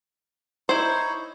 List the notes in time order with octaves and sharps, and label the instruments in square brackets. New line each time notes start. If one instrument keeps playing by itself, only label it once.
[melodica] D#4 C#5 [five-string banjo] E4 C5